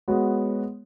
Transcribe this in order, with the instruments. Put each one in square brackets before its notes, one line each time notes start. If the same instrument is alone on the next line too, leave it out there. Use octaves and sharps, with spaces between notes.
[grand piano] G#3 B3 F#4 C#5